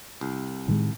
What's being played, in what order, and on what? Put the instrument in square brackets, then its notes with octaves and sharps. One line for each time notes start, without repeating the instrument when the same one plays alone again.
[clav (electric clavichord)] C2
[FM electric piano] A2 [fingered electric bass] D#3 G3 G#3